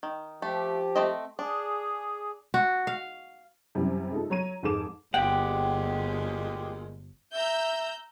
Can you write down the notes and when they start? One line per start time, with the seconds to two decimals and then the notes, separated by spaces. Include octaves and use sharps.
0.03 D#3
0.42 F3 A3 G4
0.96 A3 C4 D#5
1.39 D4 G#4
2.54 F#4
2.87 F5
3.75 F#2 C3 E3 G3
4.12 G#3 D#4 F4 A4
4.30 F#3 C#5 A#5 D#7
4.63 F1 G#2 G#4 A4 D6 E7
5.14 G1 D2 A#2 G#3 G4 F#5 G5
7.33 E5 A#5 E6 G6